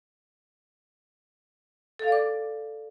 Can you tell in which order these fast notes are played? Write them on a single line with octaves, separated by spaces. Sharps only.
A4 F5 D5 D6